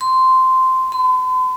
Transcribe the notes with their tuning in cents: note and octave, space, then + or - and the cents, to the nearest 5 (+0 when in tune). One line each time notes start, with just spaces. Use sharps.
C6 -10
C6 -45